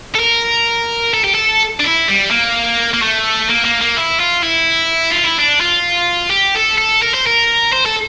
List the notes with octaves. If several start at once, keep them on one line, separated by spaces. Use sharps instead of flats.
A4
A#4
A4
G4
A4
D4
E4
G3
A#3
A#3
A3
A#3
A#3
A#3
E4
F4
E4
F4
E4
D4
F4
G4
A4
A4
A#4
C5
A#4
C5
A4